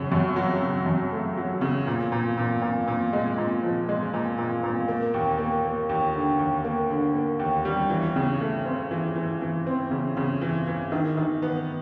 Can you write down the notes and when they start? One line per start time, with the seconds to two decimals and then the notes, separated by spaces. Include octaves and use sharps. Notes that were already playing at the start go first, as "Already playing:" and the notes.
Already playing: F#2 C#3
0.12 F#2
0.36 F#3
0.62 C#3
0.86 F#2
1.12 A3
1.37 F#3
1.61 C#3
1.87 A#2
2.12 A#2
2.37 A#2
2.62 A#2
2.88 A#2
3.13 G#3
3.38 A#2
3.63 F3
3.89 G#3
4.13 A#2
4.38 A#2
4.63 A#2
4.88 A#3
5.14 D#2
5.38 A#3
5.64 A#3
5.89 D#2
6.14 D3
6.39 D#2
6.64 A#3
6.90 D3
7.14 A#3
7.39 D#2
7.65 G3
7.90 E3
8.16 C#3
8.41 A3
8.65 C4
8.91 E3
9.16 E3
9.41 E3
9.67 C4
9.91 C#3
10.17 C#3
10.41 E3
10.67 E3
10.92 D#3
11.17 D#3
11.42 B3